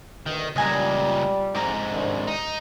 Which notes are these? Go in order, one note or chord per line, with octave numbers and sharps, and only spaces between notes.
D2 B2 D#3
C#2 A#2 G3 D#5 G#5 A#5
F2 G#2 A#5 D6
C2 D#3 D4
D#4